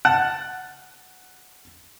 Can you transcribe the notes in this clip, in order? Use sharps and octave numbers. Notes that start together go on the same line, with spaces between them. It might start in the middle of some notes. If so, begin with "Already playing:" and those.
F#5 A5